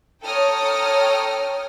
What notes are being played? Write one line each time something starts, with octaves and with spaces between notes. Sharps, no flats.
A4 C#5 G5 A#5 D#6 F6